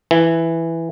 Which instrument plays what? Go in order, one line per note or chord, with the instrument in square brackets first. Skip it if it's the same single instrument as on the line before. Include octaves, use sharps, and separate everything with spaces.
[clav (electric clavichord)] E3